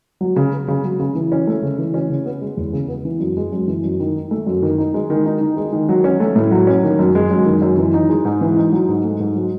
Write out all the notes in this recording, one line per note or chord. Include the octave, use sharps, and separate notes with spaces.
F#3
C#3
B3
C#3
F#3
C#3
E3
C#4
A3
C#3
E3
C#4
C#3
B3
G#3
E2
C#3
B3
E3
F#2
G#3
F#2
E3
F#2
D#3
D#4
A3
F#2
D#3
D#4
G#3
D#3
D#4
D#3
G#3
D#3
F#3
C#4
A3
A2
F#3
C#4
D#3
F#2
G#3
F#2
D#3
F#2
E3
D#4
G#3
G#2
E3
D#4
F#3
G#2
A3
G#2
F#3